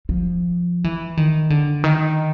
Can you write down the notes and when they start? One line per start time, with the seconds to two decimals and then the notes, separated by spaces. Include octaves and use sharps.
0.09 F3
0.84 E3
1.17 D#3
1.50 D3
1.84 D#3